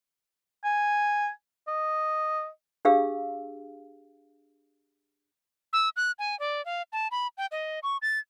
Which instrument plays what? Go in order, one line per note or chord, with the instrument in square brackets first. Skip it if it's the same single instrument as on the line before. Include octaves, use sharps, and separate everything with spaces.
[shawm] G#5
D#5
[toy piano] D4 G4 G#4 F5 E6
[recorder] E6
F#6
G#5
D5
F5
A5
B5
G5
D#5
C#6
A6